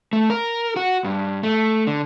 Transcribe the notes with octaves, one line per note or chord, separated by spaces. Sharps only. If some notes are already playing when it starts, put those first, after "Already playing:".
A3
A#4
F#4
G2
A3
D3